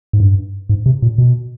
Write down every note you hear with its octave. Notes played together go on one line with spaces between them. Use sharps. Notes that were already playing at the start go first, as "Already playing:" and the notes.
G#2
G2
G#2
C3
A#2
B2